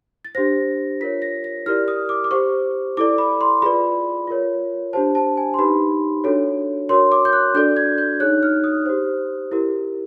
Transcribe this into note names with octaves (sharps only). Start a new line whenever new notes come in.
A6
D4 G4 C5 A#6
F4 A#4 C#5 B6
A#6
A#6
E4 G4 A#4 D5 F6
D#6
D6
D6
G4 C5 C#6
E4 A4 D5 D6
B5
C6
F4 G#4 B4 D5 B5
F4 A#4 C#5
D4 G4 C5 A5
A5
G#5
C6
D#4 G4 B4 B5
D4 F#4 A4 C#5
F#4 A#4 C#5 C6
D6
G6
F#6
D4 F#4 A4 D5 G6
G#6
G6
D#4 G#4 C#5 F#6
F6
D#6
G4 C5
E4 G4 A#4